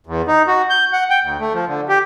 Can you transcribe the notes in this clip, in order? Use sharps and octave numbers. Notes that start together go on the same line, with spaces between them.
E2
D#4
F#4
G6
F#5
G5
D2
A3
F3
D3
G4